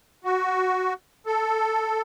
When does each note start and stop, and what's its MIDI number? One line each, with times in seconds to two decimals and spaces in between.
0.24 0.94 66
1.26 2.02 69